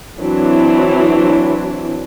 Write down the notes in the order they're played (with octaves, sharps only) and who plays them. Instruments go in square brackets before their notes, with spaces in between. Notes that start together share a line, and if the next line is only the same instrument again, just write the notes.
[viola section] E3 F#3 C4 D4 E4